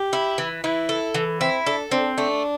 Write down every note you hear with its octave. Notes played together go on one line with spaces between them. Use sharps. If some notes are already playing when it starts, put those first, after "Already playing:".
Already playing: G4
E4
E3
E3 E4
A4
E3
C4 E4
D4 A4
C4 D4
A3 D4